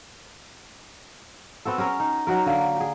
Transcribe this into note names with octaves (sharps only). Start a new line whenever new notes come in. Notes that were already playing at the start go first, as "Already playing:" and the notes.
B3 C4 F#4 A4
C#4 G#4 A#4 C#5
D#4
F#3 D#4 F#4 A#4
D3 A#3
G4 G#4